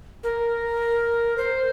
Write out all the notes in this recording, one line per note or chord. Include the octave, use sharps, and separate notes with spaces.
A#4
C5